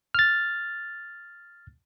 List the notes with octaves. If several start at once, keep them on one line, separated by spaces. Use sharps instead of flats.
F6 A6